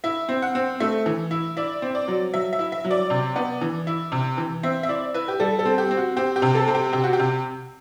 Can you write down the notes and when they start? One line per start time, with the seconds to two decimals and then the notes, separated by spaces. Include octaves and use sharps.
0.04 E4 E5
0.29 C4
0.42 F#5
0.55 C4
0.80 A3 E5
1.06 E3
1.31 E4
1.57 E4 D5
1.82 C4
1.95 D5
2.08 F#3
2.34 F#3 E5
2.53 E5
2.59 E4
2.72 E5
2.85 F#3
2.91 D5
3.10 C3
3.36 B3
3.61 E3
3.87 E4
4.12 C3
4.38 E3
4.63 C4 E5
4.83 E5
4.89 E4 D5
5.14 E4 B4
5.28 G4
5.40 G3 A4
5.59 A4
5.66 C4
5.78 G4
5.91 C4
5.97 F#4
6.17 C4 G4
6.36 G4
6.42 C3
6.55 A4
6.68 C4
6.75 G4
6.93 C3 G4
7.04 F#4
7.13 G4
7.19 C3